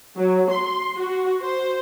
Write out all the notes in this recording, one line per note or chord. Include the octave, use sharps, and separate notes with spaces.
F#3
C6
F#4
C5